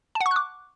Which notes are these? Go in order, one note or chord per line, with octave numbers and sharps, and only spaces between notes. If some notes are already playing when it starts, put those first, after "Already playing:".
A5
F#5
C#6
F#6
D6